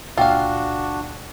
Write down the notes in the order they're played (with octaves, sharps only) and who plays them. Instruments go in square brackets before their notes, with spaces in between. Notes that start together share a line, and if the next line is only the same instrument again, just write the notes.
[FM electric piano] C#2 A#2 [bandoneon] D4 F#4 [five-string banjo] F4 F5 [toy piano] G5 E6